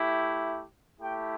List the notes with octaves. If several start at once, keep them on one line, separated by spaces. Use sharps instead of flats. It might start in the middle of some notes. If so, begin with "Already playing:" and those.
Already playing: A3 E4 G4
A3 E4 G4 G5